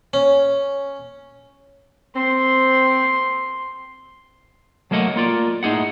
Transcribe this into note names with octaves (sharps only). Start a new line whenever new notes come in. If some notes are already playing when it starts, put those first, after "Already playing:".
C#4
C4 C6
F#3 A3 A#3 D#5 F#5
A#3 F4 D5
A2 D#4 G#4 F#5